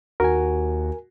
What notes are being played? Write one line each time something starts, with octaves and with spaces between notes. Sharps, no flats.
D#2 F#4 A#4 G#5